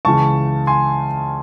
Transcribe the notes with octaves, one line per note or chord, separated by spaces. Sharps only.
C#2 C#3 E3 A5 C#6
G#5 C6